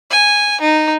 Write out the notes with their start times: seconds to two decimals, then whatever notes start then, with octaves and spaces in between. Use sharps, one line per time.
0.11 G#5
0.61 D#4